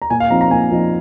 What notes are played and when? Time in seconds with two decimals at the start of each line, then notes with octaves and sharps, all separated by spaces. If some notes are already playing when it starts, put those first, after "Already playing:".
0.02 A#5
0.10 A#2 G#5
0.20 F5
0.30 F3 C4 D#4 A#5
0.41 A#5
0.51 A#2 G#5
0.71 F3 C4 D#4